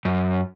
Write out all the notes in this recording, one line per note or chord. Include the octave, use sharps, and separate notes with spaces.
F#2